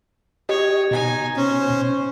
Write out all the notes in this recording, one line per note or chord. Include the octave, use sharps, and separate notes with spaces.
G4 C#5 D#5
B2 D#4 G#5
C#4 C5